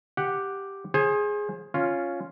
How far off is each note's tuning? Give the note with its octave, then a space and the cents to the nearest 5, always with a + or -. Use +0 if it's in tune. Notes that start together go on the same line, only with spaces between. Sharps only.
G4 +0 F#5 +0
G#4 +0 C5 +35
C#4 +0 F4 +0